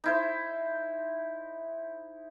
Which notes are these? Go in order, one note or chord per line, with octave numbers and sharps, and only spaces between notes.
D#4 E4 C5